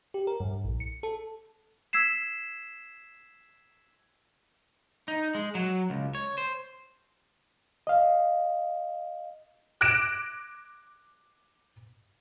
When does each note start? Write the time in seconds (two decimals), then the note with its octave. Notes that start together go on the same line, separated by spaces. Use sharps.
0.14 G4
0.27 A#4
0.40 G2
0.64 A#1
0.80 C#7
1.03 A4
1.93 E6 G#6 B6 C7 E7
5.08 D#4
5.35 G#3
5.55 F#3
5.90 C#2
6.15 C#5
6.38 C5
7.87 D#5 F5
9.81 D6 F#6 G#6 A#6 D7 E7